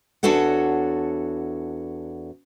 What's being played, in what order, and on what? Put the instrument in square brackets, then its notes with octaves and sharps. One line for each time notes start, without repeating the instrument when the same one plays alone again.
[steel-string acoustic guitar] E2 D4 F#4 A4 C#5 F#5